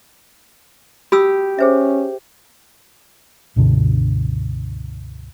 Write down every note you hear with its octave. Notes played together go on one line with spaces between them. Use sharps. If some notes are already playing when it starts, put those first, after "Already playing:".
G4 B5 D#6 E6
C#4 G#4 C5 E5
C#2 G2 B2 D3